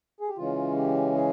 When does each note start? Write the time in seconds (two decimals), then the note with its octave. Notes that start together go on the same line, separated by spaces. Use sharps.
0.20 G#4
0.29 G4
0.37 C#3 E3 G#3 C#4 F4
0.76 G4
1.15 G#4